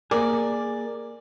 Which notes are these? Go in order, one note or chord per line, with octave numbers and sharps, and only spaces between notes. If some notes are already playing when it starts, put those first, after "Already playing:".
A#3 G#4 A#4 D5